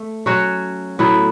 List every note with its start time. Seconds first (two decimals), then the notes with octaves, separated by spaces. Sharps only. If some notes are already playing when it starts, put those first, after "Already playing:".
Already playing: A3
0.26 F#3 C#4 F#4 C#5
0.99 A2 F#3 B3 E4